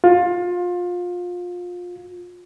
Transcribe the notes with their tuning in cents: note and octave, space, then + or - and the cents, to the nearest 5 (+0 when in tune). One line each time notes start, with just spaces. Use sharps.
F4 +25